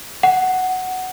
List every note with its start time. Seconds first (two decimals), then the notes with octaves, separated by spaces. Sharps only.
0.23 F#5